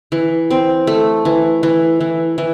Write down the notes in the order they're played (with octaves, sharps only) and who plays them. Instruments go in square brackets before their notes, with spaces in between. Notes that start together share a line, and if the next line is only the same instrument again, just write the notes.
[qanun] E3
C4
A3
E3
E3
E3
E3